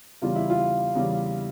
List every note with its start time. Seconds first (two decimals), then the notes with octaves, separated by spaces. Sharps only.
0.22 E2 C#3 G3 F4
0.35 E4
0.50 F4
0.95 E2 C#3 G3